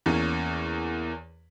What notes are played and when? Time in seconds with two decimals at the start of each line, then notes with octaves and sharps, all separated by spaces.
0.06 E2 A#3 C#4